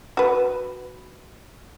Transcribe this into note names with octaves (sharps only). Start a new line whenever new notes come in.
F#4 B4